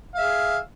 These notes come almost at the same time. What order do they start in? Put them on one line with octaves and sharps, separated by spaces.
F5 E5 G#4